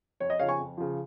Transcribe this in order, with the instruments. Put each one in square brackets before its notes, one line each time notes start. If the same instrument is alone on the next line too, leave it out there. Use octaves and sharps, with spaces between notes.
[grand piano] F2 C#5
D#5
C#3 F3 C#5 F5
G#5 C#6
F2
C#3 F3